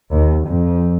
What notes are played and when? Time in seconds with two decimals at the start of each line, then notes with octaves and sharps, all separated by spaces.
0.11 D#2
0.46 F2